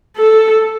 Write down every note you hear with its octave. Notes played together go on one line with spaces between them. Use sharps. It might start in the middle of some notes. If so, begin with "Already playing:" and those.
A4